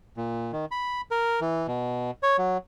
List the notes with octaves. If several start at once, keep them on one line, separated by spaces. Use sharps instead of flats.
A#2
D#3
B5
A#4
E3
B2
C#5
F#3